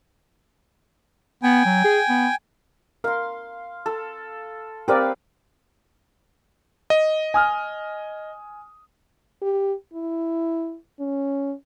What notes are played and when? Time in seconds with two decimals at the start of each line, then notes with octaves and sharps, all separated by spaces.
1.43 B3 G5 G#5
1.65 F#3
1.84 G#4
2.09 B3
3.04 A#4 F5 C6
3.86 A4
4.88 C4 G4 A#4 B4 D5 F5
6.90 D#5
7.34 G#5 D#6 F6
9.42 G4
9.94 E4
11.00 C#4